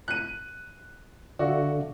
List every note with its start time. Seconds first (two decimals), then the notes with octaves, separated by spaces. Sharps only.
0.08 F#6 D#7
1.39 D3 F#4 D5 E5 F5